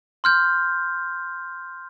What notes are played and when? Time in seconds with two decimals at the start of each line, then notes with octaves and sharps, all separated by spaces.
0.24 C6 F6 G6